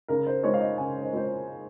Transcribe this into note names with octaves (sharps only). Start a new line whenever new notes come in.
C#3 A#4
C5
G#3 C4 F4 C#5
F5
D#5
C#3 G#5
C5
G#3 C4 F4 C5